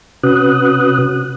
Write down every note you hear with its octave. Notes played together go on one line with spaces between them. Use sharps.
C3 C#4 F#4 B4 D#6 F#6